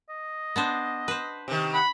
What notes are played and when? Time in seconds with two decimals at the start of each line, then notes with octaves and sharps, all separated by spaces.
0.09 D#5
0.56 B3 D4 C5
1.08 B4 C5
1.48 C3 D#3
1.74 F#5 B5